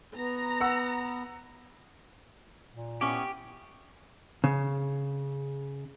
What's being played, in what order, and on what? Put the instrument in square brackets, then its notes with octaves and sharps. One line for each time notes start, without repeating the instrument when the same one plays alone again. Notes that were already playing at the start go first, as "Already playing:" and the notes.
[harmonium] B3 [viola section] A#5
[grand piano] F#5 E6
[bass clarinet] A#2
[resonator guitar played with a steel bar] B3 C#4 E4 [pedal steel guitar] G4 [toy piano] G#5 C#6 D6
[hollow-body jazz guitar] C#3